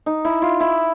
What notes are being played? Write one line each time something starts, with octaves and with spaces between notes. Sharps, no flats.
D#4
E4
F4
E4